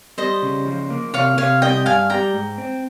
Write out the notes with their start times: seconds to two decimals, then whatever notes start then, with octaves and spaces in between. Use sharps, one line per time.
0.18 G3 C5 D#5
0.42 C#3
0.66 F3
0.90 A#3
1.14 C3 C#5 F5
1.37 C3 C#5 F5
1.62 G3 D#5 G5
1.86 G2 F5 G#5
2.10 G3 G5 A#5
2.34 G#2
2.58 C4